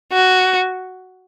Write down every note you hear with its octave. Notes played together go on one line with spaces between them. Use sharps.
F#4